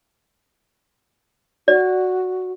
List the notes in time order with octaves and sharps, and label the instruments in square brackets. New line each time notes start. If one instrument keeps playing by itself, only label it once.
[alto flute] F#4 [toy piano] D5